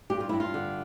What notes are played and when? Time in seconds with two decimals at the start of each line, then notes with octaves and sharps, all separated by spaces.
0.10 G2 G4
0.20 F4
0.29 G2 E4
0.40 F4
0.54 D3